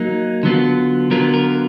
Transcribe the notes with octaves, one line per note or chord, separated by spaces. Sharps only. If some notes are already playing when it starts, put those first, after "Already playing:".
Already playing: F#3 A#3 D#4
D3 F#3 B3 F4
D3 F#3 B3 F4 A#4
A#4